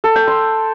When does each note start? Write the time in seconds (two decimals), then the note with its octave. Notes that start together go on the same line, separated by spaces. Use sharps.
0.04 A4
0.16 G5
0.27 C6